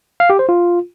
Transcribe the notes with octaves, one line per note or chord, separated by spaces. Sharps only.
F5
G4
C5
F4